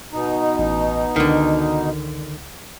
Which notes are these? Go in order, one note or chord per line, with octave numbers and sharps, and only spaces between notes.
B2 D#4
A1
C#2 D3 D#3